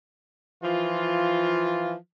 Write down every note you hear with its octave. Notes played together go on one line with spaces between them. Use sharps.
E3 F3 F4